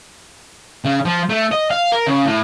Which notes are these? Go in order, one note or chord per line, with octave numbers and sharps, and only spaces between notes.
C#3
F3
A3
D#5
F5
A#4
C#3
A2